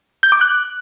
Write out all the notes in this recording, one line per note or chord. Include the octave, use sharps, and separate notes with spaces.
G6
D6
F#6